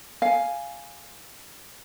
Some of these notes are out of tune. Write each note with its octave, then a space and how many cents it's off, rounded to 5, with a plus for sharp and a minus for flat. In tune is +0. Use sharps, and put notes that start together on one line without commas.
F5 +0 G#5 +0